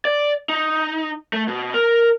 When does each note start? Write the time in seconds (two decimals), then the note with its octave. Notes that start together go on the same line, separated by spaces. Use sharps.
0.05 D5
0.49 D#4
1.33 A3
1.48 B2
1.74 A#4